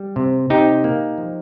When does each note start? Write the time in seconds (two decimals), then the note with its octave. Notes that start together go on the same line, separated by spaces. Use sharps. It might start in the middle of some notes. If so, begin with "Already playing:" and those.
Already playing: G3
0.16 C3
0.50 C3 D#4 G4
0.84 A#3
1.18 F3